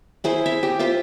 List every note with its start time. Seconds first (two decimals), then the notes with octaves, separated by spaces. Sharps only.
0.24 E4 G#4 C5
0.46 E5
0.63 G4
0.79 F4 G4 C5 E5